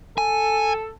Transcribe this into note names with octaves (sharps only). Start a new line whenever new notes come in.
A4 G#5